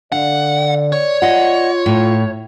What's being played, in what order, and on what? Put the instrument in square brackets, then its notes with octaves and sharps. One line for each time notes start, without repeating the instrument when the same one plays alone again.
[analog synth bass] D3 [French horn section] D5 [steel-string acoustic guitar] F5 [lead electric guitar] F#5
[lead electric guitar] C#5
[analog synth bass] F4 [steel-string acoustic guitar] D#5 F#5
[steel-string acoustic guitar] A2